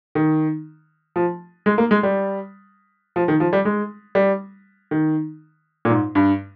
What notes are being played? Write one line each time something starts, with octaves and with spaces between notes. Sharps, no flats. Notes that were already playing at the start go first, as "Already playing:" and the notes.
D#3
F3
G#3
A#3
G#3
G3
F3
D#3
F3
G3
G#3
G3
D#3
A#2
G#2
G2